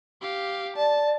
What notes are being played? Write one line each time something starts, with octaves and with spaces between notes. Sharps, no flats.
G4 F5
D5 A5